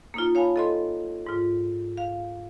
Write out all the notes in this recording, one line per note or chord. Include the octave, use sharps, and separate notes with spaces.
A#3 D#4 F4
C#5 F5 G#5 A5 B5
A4 D#5 C6
G#2 F4
F5